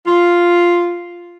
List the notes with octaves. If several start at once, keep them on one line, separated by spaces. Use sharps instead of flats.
F4